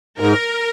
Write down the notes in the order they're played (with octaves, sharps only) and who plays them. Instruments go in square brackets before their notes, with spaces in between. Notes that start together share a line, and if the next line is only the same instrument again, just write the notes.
[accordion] G#2 [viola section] A#4